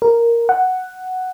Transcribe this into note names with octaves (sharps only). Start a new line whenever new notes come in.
A#4
F#5